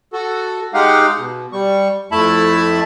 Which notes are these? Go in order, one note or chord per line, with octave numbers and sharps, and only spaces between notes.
F#4 A4
G#3 D#4 G4 F5 F#5
B2
G3 C#6
F2 A3 E4 E5 A5 B5